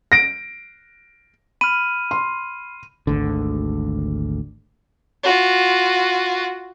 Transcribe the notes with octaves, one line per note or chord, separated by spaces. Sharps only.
A#6 D7
B5 F6 D#7
C6
G#1 D2 D3
F4 F#4